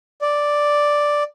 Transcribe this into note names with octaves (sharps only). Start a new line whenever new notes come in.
D5